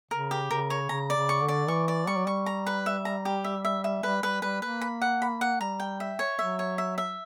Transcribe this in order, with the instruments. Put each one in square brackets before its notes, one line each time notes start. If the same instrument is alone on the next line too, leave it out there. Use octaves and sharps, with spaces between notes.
[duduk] C#3 [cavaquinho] A#4
[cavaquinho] G4
[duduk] C#3 [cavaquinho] A#4
[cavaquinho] C#5
[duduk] C#3 [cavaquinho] A#5
[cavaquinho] D5
[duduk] C#3
[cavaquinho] C#6
[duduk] D3
[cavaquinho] D5
[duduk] E3 [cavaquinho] C#6
[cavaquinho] D5
[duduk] G3 [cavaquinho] C#6
[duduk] F#3
[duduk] G3 [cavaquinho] C#6
[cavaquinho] A#5
B4
E5
A#5
G4
E5
E5
E5
[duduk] G3 [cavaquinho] B4
[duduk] G3 [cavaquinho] B4
[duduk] G3 [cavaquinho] B4
[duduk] A#3 [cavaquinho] B4
[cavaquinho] B5
F#5
B5
F#5
[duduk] G3 [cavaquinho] A#5
[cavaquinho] G5
E5
C#5
[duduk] F#3 [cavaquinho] E5
[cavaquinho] C#5
E5
E5